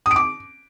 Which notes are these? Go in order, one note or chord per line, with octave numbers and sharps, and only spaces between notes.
D#6
D7
D6